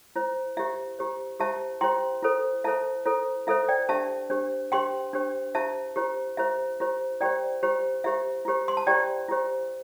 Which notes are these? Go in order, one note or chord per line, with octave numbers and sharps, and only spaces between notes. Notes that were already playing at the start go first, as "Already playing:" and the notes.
E4 C5
E4 G4 C5 E5
E4 G4 C5
E4 G4 C5 E5 A5
E4 G4 C5 G5 C6
E4 A4 C5
E4 A4 C5 E5 A5
E4 A4 C5
E4 A4 C5 E5
D5 G5
D4 G4 C5 E5 A5
D4 G4 C5
D4 G4 C5 G5 C6
D4 G4 C5
E4 G4 C5 E5 A5
E4 G4 C5
E4 G4 C5 E5
E4 G4 C5
E4 G4 C5 D5 G5
E4 G4 C5
E4 G4 C5 E5
E4 G4 C5
C6
A5
E4 G4 C5 D5 G5
E4 G4 C5